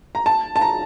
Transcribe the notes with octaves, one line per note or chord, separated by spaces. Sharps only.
A#5
A5
A5
A#5